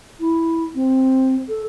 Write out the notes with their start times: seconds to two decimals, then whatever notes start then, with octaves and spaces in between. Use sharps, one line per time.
0.20 E4
0.75 C4
1.49 A4